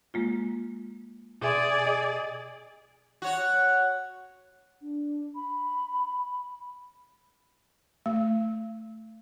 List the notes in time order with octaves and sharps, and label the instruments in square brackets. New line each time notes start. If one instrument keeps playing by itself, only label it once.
[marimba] G#3 A#3 F4
[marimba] B2 E5 C6 [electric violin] G#4 D5
[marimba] D#5
[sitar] F#4 C#5
[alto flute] D4
B5
[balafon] A3